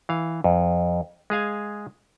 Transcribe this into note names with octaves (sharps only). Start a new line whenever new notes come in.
E3 F5
F2
G#3 G#4 F5 G#5